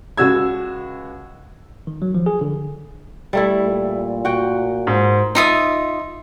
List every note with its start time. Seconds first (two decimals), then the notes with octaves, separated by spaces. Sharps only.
0.17 C#2 F#4 E6 G#6
1.87 D#3
2.02 F#3
2.15 F3
2.26 G#4
2.41 D3
3.33 G3 A3 E4
3.64 A#2
4.25 F#4 G5
4.87 G#2
5.35 D#4 F4 E5 D#6